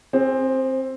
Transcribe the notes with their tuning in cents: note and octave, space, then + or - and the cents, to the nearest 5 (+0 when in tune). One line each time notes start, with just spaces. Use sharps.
C4 +10 G#4 -25